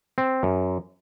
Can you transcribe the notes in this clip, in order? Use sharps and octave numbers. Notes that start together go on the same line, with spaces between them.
C4
F#2